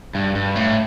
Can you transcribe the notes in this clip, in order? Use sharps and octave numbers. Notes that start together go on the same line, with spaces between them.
G2
G2
A2